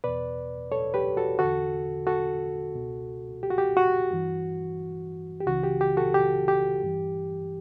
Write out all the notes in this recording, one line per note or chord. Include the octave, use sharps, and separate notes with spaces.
E2 B2 B4 D5
A4 C#5
G4 B4
F#4 A4
E2 D3 F#4 A4
F#4 A4
C#2 B2
G4
F#4
G4
F#4
G2 E3
G4
C#2 C#3 E3 F#4
G4
G4
F#4 A4
G4
G4
G2 E3